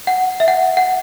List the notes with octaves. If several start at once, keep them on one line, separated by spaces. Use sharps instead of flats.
F#5
E5
F#5
F#5